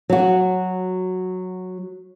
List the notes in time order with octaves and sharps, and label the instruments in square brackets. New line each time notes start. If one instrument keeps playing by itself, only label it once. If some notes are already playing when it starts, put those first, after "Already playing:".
[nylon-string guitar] F#3 F#4